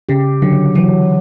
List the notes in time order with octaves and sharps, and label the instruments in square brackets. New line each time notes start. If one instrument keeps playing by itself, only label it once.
[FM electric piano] C#3 [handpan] G4
[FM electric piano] D3 [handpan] F#3
[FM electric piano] E3 [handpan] F#3